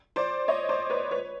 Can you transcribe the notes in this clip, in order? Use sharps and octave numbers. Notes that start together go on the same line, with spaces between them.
C5 D5
C#5 D#5
C5 D5
B4 C#5
B4 C#5